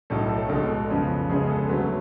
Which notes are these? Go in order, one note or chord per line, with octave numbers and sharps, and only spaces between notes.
B1 A2 F#3 A3 A4
A4
B1 B2 G#3 A4
F2 C#3 F3 B3
D2 C#3 G#3 B3 G#4
A4
D2 D3 F#3 A3 B4